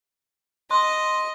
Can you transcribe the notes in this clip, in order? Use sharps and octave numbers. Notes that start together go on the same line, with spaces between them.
D#5 C6